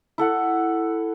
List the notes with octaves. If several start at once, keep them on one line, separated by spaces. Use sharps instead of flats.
E4 A4 F#5